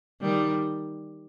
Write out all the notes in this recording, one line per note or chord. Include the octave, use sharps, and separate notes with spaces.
D#3 G3